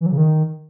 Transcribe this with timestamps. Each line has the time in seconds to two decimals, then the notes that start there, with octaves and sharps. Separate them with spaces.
0.01 E3
0.06 F#3
0.12 C#3
0.17 D#3